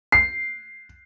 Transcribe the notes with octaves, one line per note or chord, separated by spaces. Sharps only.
C7